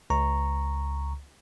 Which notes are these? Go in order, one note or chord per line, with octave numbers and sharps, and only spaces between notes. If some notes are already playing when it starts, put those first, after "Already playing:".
C#2 A#5 C#6